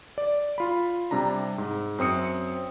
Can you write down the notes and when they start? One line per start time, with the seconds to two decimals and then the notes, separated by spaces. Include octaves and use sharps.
0.18 D5
0.58 F4 B5
1.11 C3 G3 D4 A#5
1.58 G#2
1.98 F#2 C4 D#6 C#7